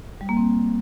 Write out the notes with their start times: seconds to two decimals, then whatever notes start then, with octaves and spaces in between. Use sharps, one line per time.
0.21 G3
0.29 A#3
0.37 C4